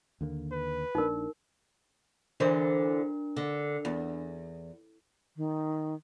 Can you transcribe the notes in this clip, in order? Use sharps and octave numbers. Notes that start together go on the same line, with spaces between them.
D#2 D3 A#3
B4
A#1 D4 D#4 A#4
D3 E3 D4 A#4 C5
D3
E2
D#3